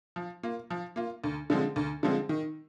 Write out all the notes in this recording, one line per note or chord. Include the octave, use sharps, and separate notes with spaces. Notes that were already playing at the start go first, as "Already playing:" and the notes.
F3
A#3 F4
F3
A#3 F4
D2
D3 F3 G#3 C4
D2
D3 F3 G#3 C4
D#3